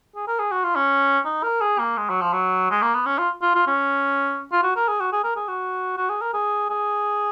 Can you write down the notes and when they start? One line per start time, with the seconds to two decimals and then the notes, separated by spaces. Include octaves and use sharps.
0.16 G#4
0.28 A#4
0.39 G#4
0.51 F#4
0.64 F4
0.76 C#4
1.25 D#4
1.43 A#4
1.61 G#4
1.79 A#3
1.97 G#3
2.09 F#3
2.21 F3
2.33 F#3
2.70 G#3
2.82 A#3
2.94 B3
3.06 C#4
3.18 F4
3.42 F4
3.55 F4
3.67 C#4
4.52 F4
4.63 F#4
4.76 A#4
4.88 G#4
5.00 F#4
5.12 G#4
5.24 A#4
5.36 G#4
5.48 F#4
5.97 F#4
6.09 G#4
6.21 A#4
6.34 G#4
6.70 G#4